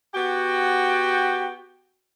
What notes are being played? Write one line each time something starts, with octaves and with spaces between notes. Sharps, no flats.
B3 F#4 G4 G5